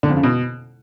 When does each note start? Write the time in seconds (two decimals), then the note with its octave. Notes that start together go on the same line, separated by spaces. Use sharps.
0.03 D3
0.10 F2
0.17 C#3
0.23 B2